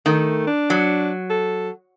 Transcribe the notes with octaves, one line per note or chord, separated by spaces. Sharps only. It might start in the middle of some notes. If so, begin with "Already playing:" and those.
D#3 A3
D4
F#3
A4